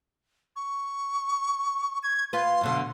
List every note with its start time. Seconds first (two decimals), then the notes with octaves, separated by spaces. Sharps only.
0.56 C#6
2.03 G#6
2.33 F4 B4 C6
2.61 F#2 B2 D3